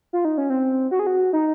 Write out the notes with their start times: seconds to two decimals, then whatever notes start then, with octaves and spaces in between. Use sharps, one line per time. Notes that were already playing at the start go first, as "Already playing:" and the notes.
0.13 F4
0.25 D#4
0.38 C#4
0.50 C4
0.91 F#4
0.99 G#4
1.07 F#4
1.33 D#4